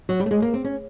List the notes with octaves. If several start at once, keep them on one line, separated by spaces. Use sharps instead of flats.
F#3
G3
A3
G#3
A#3
C4
C#4